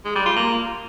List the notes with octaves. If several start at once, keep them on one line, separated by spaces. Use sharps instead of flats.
G#3
G3
F4
A#3